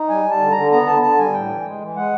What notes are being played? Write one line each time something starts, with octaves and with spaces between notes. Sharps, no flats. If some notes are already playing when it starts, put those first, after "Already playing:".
Already playing: D#4
G3 G#5
G3
A5
D3
D3 A#5
B3 A#5
D3 A5
D3 A5
G3 G#5
A2 G5
E3
G#3
E3
G#3 F#5